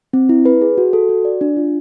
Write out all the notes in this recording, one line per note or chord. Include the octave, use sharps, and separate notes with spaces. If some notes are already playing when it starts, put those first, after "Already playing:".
C4
E4
B4
G#4
F#4
A4
F#4
D5
D4
F4